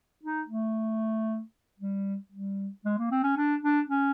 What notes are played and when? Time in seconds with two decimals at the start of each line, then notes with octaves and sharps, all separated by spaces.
0.23 D#4
0.48 A3
1.80 G3
2.32 G3
2.85 G#3
2.98 A#3
3.11 C4
3.23 C#4
3.37 D4
3.63 D4
3.89 C#4